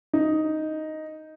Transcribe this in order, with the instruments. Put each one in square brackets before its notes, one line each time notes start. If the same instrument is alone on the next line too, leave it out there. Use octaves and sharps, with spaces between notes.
[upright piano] D#4